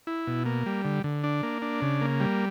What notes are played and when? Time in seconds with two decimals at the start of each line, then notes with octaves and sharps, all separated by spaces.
0.07 E4
0.27 B2
0.46 A#3
0.66 G3
0.85 D3
1.04 D3
1.24 D4
1.43 A#3
1.62 D4
1.82 C#3
2.01 A#3
2.20 G3